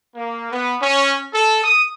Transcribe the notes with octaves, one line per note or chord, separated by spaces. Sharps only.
A#3
B3
C#4
A4
D#6